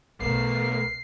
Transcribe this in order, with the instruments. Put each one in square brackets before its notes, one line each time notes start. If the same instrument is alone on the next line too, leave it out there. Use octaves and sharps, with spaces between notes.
[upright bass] B1 [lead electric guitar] A3 B3 [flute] A#4 [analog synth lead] C7